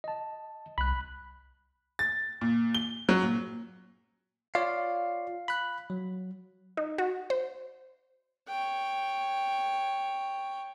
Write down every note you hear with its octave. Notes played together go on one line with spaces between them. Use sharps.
D#5 A5
C2 B5 F#6
A6
A#2
G7
F#3
A#2
F4 C#5 D5 F5
B5 F#6
F#3
D#4
F#4
C5
C#5 G5